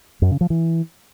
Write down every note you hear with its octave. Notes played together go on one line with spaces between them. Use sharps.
F#2
C#3
F3
E3